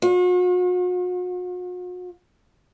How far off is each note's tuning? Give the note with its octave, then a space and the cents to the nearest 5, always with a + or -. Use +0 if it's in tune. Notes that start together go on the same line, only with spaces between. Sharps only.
F#4 -45